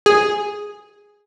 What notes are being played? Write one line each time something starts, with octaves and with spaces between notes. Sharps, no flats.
G#4